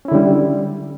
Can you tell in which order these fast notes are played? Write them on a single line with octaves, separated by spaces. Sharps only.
C#4 E4 D3 G3